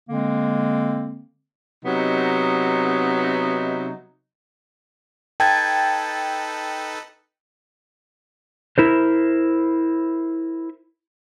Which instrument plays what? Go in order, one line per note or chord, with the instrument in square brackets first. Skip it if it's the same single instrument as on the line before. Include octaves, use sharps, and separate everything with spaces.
[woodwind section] D3 G#3 A#3 C4
[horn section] C3 F#3 B3 D#4
[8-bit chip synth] D#4 A4 B4 [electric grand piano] G5 [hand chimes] A5 G#6 A6
[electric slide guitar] E4 A#4 C5